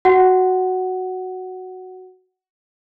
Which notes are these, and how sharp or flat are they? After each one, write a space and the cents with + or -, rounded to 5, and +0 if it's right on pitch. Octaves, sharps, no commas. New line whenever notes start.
F#4 +0 F#5 +10